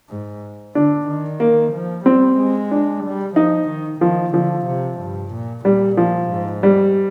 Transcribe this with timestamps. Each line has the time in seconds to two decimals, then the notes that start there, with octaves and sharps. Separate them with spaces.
0.10 G#2
0.75 D3 D4
1.08 D#3
1.40 A#3
1.73 F3
2.06 G3 C4
2.39 G#3
2.71 D4
3.04 G3
3.36 F3 D#4
3.69 D#3
4.01 D#3 F3
4.34 D3 F3
4.67 C3
4.99 G2
5.32 A#2
5.65 A#2 G3
5.97 F3
6.30 G#2
6.63 G3